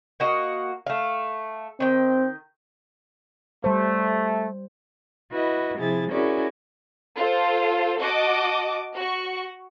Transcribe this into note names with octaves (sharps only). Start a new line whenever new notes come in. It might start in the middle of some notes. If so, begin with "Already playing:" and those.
A#3 F#4 D#5
A3 F5
D#3 C4 G5
G3 A3 C5
E4 F#4 B4 D#5
C3 F3 E4 G#4 A6
C#4 E4 F#4 G#4 A#4 D5
F4 A4 C5
F#4 D#5 A5 D6
F#4 C#6